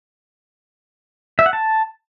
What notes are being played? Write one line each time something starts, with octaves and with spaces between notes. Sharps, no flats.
E5
F#5
A5